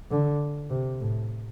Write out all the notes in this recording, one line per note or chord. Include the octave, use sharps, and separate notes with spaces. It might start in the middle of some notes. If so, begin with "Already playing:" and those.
D3
C3
A2